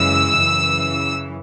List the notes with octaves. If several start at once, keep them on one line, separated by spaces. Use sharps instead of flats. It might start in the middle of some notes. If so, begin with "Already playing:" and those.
Already playing: F#2 C#3 E3 G#3 E6
F#2 C#3 E3